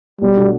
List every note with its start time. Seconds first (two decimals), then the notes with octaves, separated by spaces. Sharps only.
0.21 B1 G3
0.36 B2 A3 D4 F#4